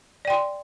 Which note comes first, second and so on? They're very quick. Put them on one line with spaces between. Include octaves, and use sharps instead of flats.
D5 G5 C6